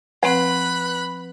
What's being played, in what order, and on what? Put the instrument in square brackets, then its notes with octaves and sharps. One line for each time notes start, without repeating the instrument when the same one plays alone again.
[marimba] F3 C4 [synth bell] B4 [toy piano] F#5 [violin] B5 F#6